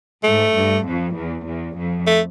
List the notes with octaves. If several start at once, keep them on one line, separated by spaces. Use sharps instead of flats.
G#2 A3
G2
F2
E2
E2
F2
A3